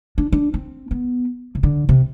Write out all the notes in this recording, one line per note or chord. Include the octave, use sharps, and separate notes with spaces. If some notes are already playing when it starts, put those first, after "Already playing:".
D4
D4
C4
B3
C3
D3
C3